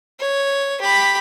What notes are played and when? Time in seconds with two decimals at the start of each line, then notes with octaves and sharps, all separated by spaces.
0.20 C#5
0.81 G4 B5